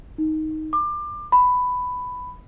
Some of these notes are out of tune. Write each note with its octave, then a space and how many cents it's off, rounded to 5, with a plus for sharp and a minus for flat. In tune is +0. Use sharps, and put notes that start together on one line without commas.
D#4 +5
D6 +25
B5 +10